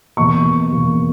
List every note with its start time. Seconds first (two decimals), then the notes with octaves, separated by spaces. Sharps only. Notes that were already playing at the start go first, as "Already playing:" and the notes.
0.17 E2 B2 A#3 C#6
0.71 E2 B2 A#3